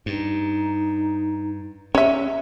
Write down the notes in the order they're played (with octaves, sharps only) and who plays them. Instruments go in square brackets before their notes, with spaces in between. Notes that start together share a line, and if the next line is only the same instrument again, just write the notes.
[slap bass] G2 [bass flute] D#4
[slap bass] C#4 [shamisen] C#5 E5